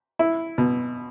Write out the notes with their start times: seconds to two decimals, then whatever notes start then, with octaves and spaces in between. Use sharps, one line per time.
0.19 E4
0.58 B2